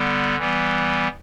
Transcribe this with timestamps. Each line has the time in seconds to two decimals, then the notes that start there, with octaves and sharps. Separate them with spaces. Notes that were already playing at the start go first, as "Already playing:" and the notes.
Already playing: D3 G3 B3
0.37 E3 G3 B3